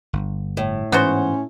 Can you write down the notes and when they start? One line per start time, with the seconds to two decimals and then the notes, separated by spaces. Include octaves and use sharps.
0.13 G1
0.57 A2
0.92 G#2 E3 B3 C#4 F#4 C5